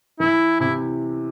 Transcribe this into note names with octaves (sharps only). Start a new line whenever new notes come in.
E3 E4
C3 E4